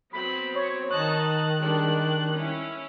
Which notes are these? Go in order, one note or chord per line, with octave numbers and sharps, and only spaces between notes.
F#3 B3 C4 B5
C#5
D#3 D#4 D#5 A5 F#6
G3 G#3 D4
C#4 E4